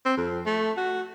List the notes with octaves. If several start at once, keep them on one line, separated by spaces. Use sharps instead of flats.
C4
F2
A3
F#4